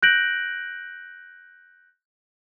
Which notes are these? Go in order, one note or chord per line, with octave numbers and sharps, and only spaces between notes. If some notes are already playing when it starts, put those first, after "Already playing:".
F#6 G6 A#6 D7 F#7